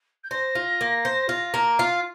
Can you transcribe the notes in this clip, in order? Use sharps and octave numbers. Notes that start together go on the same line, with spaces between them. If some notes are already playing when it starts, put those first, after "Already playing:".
G6
C5 A#6
F4
A#3
C5
F4
A#3
F4 C7